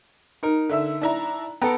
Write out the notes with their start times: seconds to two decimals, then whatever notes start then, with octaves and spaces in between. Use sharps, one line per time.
0.43 D#4 A#4
0.69 D3 E5 E6
1.01 D4 E4 A#5
1.62 B3 A4 G5 A#5